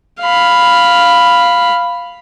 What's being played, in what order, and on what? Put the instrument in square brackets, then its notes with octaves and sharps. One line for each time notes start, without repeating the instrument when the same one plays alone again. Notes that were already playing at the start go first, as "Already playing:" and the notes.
[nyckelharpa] F5 B5